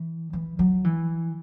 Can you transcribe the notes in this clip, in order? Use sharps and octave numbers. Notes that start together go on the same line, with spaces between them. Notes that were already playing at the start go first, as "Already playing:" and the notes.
Already playing: E3
E3
F#3
E3